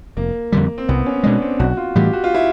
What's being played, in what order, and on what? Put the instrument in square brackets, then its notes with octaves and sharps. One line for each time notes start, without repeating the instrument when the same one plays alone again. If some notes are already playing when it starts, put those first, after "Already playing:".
[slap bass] F1 [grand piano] A#3
[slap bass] F2 D3 G3
[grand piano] C4
[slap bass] C2 [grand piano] B3
[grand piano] C#4
[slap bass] B2 G#3 [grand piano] D4
[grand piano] C4
[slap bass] B1 [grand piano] F#4
[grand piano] F4
[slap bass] A2 E3 G3 [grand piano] G4
[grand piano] F#4
F4
E4